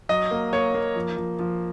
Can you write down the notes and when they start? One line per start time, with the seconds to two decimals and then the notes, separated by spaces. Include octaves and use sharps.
0.09 F#3 D#5
0.31 A#3
0.53 A#3 C#5
0.74 A#3
0.96 F3
1.17 F3
1.39 F3